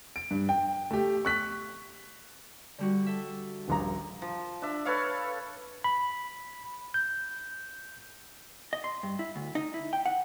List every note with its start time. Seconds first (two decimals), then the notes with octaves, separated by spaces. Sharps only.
0.16 D7
0.31 G2
0.49 G5
0.91 A3 G4
1.25 C#6 F#6 B6
2.78 D3 G3 F#4
3.06 A4 E5
3.68 D#1 A#1 A#5
4.22 F3
4.62 D4 E5
4.85 A4 B4 C#5 F5
5.84 B5
6.94 G6
8.73 D#5
8.84 C6
9.03 G2
9.19 E4
9.36 D2
9.55 D#4
9.74 E4
9.93 G5
10.06 F#5